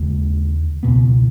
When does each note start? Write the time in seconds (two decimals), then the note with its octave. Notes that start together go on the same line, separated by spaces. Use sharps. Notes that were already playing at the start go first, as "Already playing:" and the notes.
Already playing: D#2 C#3 G#3
0.83 C#2 B2 B3